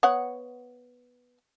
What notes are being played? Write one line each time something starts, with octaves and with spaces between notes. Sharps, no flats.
B3 C#5 F#5